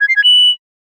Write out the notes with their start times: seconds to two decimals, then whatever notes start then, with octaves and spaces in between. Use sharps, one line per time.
0.01 G#6
0.09 C7
0.16 G#6
0.24 F#7